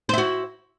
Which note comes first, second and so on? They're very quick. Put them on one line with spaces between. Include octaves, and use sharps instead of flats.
C5 E4 F#4